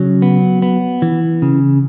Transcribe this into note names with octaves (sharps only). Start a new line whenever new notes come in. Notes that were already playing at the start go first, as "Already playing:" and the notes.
Already playing: C#3 F#3
B3
B3
E3
C#3